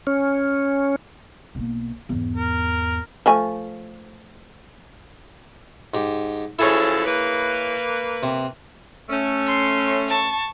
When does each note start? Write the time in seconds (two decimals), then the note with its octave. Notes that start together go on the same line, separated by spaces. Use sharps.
0.07 C#4
1.55 B1 A#3
2.09 E2 G#2
2.37 A#4
3.26 F3 A3 G#5
5.94 G#2 G4
6.59 F#2 F3 E4 G#4 A4 C#5
7.05 A#3 B4
8.23 C3
9.09 A3 C#4
9.47 C6
10.08 A5 C#6